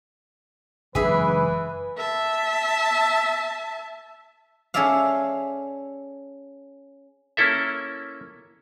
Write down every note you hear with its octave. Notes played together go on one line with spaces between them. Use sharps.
F#1 E3 G#3 D4 G#4 B4 E5
E5 A5
C#4 G#4 A4 D5 E5 F5
A#3 C#4 E4 A4 E5